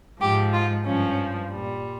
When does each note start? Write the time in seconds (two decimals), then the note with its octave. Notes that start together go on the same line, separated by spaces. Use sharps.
0.21 G#2 F3 G4
0.53 F4
0.85 G2 F3 C#4
1.50 A#2 G3